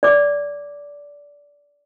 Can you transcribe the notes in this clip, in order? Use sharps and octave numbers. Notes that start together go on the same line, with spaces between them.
D5 D6